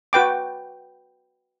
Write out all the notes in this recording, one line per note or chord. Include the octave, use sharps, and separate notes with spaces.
F#4 B4 G5 D6